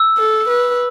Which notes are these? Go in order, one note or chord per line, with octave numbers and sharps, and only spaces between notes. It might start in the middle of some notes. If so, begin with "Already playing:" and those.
Already playing: E6
A4
B4